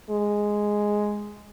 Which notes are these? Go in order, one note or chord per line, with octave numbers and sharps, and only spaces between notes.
G#3